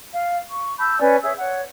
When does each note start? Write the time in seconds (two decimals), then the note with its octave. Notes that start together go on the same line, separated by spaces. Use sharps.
0.13 F5
0.49 C#6
0.79 A5 B5 E6 G6
1.00 C#4 B4 D5 G#5
1.22 G#4 C#5 E5 E6
1.39 C#5 F#5